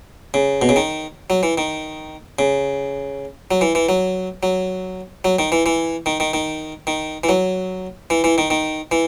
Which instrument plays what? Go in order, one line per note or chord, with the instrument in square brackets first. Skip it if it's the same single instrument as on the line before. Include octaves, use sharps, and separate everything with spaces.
[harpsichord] C#3
B2
C#3
D#3
F#3
E3
D#3
C#3
F#3
E3
E3
F#3
F#3
F#3
D#3
E3
E3
D#3
D#3
D#3
D#3
E3
F#3
E3
E3
D#3
D#3
E3